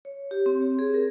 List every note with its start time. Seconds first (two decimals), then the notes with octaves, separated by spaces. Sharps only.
0.05 C#5
0.31 G4
0.46 C4
0.60 C#5
0.79 G#4
0.94 A#4